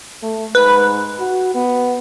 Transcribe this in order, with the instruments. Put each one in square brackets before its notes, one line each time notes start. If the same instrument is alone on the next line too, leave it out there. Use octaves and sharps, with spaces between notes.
[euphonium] A3
[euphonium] G#2 [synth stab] B4
[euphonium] F#4
B3